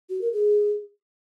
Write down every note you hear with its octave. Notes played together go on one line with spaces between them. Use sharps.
F#4
A#4
G#4